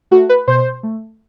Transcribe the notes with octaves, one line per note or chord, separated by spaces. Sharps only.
A3 F#4
B4
B2 C5
A3